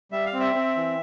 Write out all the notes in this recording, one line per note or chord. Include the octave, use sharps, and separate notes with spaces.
G3 E5
F5
C4
E5
C4
E3